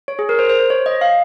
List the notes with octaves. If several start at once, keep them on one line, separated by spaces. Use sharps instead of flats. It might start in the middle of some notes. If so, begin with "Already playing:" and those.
C#5
G#4
A#4
C5
C5
C5
C#5
D#5
F5